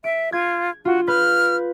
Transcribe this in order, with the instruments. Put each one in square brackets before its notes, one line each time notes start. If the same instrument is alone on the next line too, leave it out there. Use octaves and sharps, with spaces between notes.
[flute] E5 [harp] D7
[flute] F4 [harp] G#6
[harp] F4 [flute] F#4
[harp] B4 G6 [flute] F6